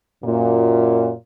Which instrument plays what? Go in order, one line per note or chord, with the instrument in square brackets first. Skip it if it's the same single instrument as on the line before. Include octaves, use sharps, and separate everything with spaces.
[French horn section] F#2 A#2